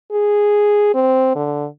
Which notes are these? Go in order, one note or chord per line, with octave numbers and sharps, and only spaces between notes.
G#4
C4
D3